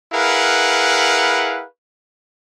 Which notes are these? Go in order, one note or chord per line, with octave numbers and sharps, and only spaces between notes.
E4 G#4 A#4 B4 F5 F#5